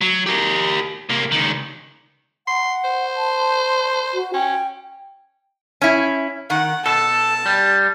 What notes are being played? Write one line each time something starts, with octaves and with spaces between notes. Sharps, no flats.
F#3
G4 A#4
C2 A#3
C#2 D#3
F#5 C6
C5
A5
F#4
C#4 G5
C#4 E4
D#3 F#5
B2 A4 A5
G3